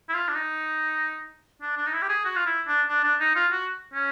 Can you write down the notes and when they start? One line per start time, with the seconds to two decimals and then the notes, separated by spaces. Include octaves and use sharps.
0.09 E4
0.14 F4
0.28 D4
0.35 D#4
1.62 D4
1.77 D4
1.87 D#4
1.93 E4
2.02 G4
2.09 G#4
2.25 F#4
2.36 F4
2.46 E4
2.67 D4
2.88 D4
3.03 D4
3.20 D#4
3.35 F4
3.52 F#4
3.94 C#4